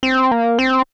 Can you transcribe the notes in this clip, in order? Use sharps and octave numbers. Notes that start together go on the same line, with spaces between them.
C4
A#3
C4